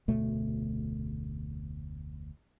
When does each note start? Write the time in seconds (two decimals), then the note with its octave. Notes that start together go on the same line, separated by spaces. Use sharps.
0.08 F1 D2 B2 A3